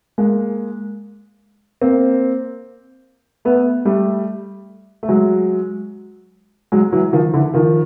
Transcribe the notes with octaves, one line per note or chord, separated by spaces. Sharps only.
G#3 A#3
A#3 C4
A3 B3
G3 A3
A3
F#3 G#3
F#3 G#3
E3 F#3
D#3 F3
D3 E3
D#3 F3